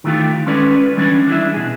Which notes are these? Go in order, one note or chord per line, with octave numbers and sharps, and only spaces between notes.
D#3 E3 A3 F4 G4
G#3 C#4 A4 B4 D5
B4
E3 G3 C#4 D4
D4 E4 G#4 E5
B2 G#4